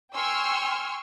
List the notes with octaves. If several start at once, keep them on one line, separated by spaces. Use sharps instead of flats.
G5 G#5 C6 C#6 E6 F6